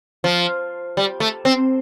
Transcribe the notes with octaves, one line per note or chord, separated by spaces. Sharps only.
F3
G3
A3
C4